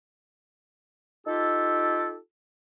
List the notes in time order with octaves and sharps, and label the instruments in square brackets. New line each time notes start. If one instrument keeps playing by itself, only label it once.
[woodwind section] D#4 F4 G4 A4